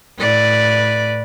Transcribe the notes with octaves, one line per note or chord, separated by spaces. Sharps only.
A2 B4 D5